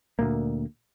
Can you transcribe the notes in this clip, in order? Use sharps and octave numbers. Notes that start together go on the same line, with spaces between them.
D2 A#2 A#3